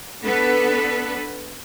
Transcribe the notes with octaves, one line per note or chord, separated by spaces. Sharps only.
B3 D4 A4 B4